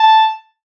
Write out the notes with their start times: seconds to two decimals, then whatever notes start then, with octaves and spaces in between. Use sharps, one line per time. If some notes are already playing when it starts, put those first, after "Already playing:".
Already playing: A5